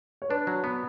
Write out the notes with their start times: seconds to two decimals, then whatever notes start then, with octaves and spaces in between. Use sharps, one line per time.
0.22 C#5
0.29 D4 B4
0.47 F#3
0.64 B3